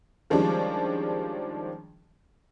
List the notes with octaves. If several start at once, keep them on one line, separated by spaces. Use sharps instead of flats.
D#3 F3 G3 G#3 C#4 D4